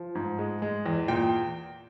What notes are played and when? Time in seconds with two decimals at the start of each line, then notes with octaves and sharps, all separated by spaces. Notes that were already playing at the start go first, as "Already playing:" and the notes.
Already playing: F3
0.15 G#2
0.39 G#3
0.62 G#3
0.86 E2
1.08 A#2 G5